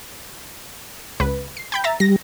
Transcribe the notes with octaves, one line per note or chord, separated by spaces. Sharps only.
C#2 B4
C7
G5 B5 G6
E5 A#5 A6
G3 A#6